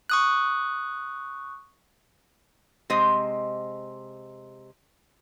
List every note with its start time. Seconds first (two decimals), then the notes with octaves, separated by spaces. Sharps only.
0.10 C#6 D#6 F#6
2.90 C3 G#3 C5 D#5